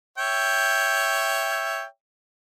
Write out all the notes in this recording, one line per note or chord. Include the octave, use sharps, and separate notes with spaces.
C#5 E5 G5